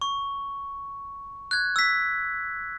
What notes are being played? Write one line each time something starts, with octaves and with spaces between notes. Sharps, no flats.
C#6
F#6 G#6
E6 B6